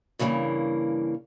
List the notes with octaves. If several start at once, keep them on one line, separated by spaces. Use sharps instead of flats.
G2 C#3 E3 G3 A#3